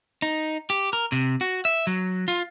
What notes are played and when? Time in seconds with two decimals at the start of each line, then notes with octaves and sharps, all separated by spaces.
0.22 D#4
0.70 G4
0.93 A#4
1.12 C3
1.41 F#4
1.65 E5
1.87 F#3
2.28 F4